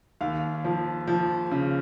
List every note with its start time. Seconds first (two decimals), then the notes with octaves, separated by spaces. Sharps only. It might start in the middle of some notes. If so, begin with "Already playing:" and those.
0.21 D#2 F5
0.65 F3
1.07 F3
1.51 C#3